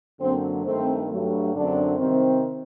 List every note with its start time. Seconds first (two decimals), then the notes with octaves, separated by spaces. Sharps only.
0.20 F#2 D3 F#3 A#3 C4
0.64 G2 D#3 A3 C4
1.10 G2 F#3 A3
1.55 F#2 D3 F#3 C4 D4
2.00 C3 D#3 G3 C4